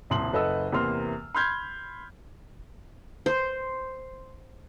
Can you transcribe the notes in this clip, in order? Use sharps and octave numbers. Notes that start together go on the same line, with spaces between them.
D#1 C2 C6 F#7
F#1 A4 B4 D#5 F#5 E6
E2 C3 E3 A#3 C6 F6
B5 C6 F6 G6 G#6
C5